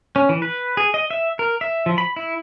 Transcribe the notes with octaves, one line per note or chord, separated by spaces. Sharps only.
C#4
E3
B4
G#4
D#5
E5
A#4
E5
F3
B5
E4